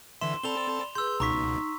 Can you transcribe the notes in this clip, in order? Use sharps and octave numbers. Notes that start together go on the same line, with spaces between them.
D3 E3 E5 C6 E7
C4 A4 D5 A5 B5 C6 F7 G7
G#4 B4 C6 E6 G6
C#2 B2 D#4 A#5 C#6 D#6 B6